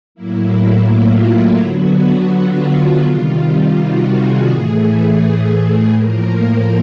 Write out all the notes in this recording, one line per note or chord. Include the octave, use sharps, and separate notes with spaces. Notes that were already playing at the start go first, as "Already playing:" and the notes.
A2 F#3 A#3 E4
F4
D3 F#3 B3 F#4
F4
C3 D#3 G3
F#4
G#4
A2 E3 A3 G#4
A2 F3 A#3 A#4
A#4